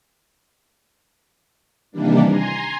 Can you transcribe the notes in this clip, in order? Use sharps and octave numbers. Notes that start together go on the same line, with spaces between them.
C3 D#3 E3 G3 A#3 D4
G#5 A#5 C6